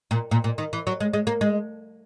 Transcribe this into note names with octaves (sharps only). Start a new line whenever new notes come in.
A#2
A#2
A#2
D#3
E3
F#3
G#3
G#3
A#3
G#3